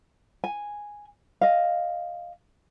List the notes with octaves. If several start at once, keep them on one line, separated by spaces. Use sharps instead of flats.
G#5
D#5 F5